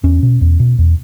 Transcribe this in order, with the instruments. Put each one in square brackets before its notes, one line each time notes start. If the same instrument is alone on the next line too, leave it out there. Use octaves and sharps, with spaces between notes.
[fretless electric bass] E2 C#4
B2
E2
B2
E2